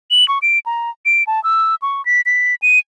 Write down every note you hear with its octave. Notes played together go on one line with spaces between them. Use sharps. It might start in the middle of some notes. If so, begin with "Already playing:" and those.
F#7
C#6
D7
A#5
D7
A5
E6
C#6
B6
B6
D#7